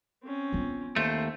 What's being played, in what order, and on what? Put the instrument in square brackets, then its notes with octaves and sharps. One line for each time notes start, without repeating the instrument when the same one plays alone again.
[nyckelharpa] C4 C#4
[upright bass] B3 F4
[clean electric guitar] D#2 A3 [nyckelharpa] C5